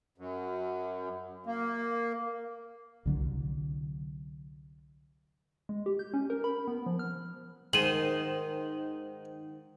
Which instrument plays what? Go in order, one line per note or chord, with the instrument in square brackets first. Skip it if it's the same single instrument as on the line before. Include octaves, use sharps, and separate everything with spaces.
[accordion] F#2
A#3
[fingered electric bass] C2 D3 F#3
[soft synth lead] G#3
G4
G6
C#4
A#4
B5
B3
F3
F6
[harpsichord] G#2 C5 C6 [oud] D#3 G#3 [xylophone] D#7 E7 F#7